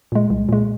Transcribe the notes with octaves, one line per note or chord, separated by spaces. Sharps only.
A#2 G#3
C2
A#2 G#3